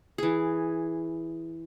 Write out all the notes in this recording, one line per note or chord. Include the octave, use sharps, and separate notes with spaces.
E3 G#4